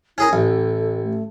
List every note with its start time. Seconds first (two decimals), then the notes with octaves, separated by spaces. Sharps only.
0.18 C#4 E4 G#4 A#4
0.33 A1 A4
1.03 A3